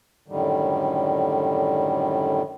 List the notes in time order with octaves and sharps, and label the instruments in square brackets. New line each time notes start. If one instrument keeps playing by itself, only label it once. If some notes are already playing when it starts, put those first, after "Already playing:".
[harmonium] F#2 A2 D3 D#3 G3